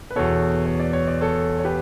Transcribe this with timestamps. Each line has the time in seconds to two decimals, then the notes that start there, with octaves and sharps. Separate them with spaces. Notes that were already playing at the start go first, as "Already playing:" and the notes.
0.11 B4
0.16 E2 B2 A4 C#5
0.66 C#5
0.80 D5
0.93 C#5
1.07 D5
1.21 A4 C#5
1.59 C#5
1.65 G4 B4